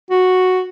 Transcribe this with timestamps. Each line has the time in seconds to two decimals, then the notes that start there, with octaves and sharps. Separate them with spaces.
0.10 F#4